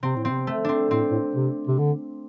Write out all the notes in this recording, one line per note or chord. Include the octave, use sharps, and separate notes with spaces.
C3 C4
A2
C3 C4
A3
C4 D4
A2 C4
A2
C3
C3
D3